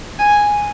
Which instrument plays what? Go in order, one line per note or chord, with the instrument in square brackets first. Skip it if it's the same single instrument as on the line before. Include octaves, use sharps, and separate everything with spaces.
[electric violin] G#5